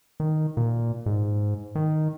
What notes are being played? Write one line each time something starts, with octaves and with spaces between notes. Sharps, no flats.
D#3
A#2
G#2
D#3